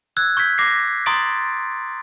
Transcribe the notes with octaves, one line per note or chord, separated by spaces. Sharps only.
E6 F#6 G#6
C#6 G6 G#6 B6
D6 A#6 C7
A#5 C6 C#6 D#6 A6 D7